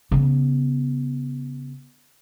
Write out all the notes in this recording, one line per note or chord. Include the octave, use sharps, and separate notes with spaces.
C#3 B3